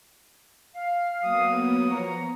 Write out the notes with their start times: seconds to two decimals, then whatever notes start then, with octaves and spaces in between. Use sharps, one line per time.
0.75 F5
1.24 F#3 A#3 B3 D#6
1.90 F3 F#3 C#5 A#5 C#6